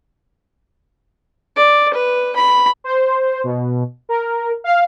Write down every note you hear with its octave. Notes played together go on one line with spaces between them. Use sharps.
D5
B4
B5
C5
B2
A#4
F5